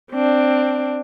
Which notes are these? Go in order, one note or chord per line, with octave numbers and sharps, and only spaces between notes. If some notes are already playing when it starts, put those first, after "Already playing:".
C4 D4